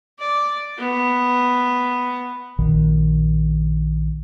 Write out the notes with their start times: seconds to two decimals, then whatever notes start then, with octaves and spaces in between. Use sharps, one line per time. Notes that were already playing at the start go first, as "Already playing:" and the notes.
0.19 D5
0.78 B3
2.58 A#1 A#2 D#3